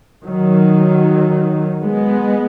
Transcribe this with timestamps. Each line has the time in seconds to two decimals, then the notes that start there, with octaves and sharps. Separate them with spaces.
0.24 D#3 F#3
1.82 G#3 B3